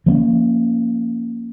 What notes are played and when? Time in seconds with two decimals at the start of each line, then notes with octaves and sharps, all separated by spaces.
0.06 F3 A#3 C#4